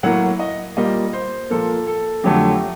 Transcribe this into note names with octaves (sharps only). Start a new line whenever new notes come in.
A2 F#3 A#3 F#5
D#5
A#2 G3 A#3 D#5
C5
A#2 F3 A#3 A4
A4
F2 D3 F#3 A3 G4